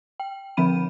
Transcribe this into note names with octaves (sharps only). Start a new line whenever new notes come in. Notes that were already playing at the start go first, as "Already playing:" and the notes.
G5
D3 F3 C4 B5 D#7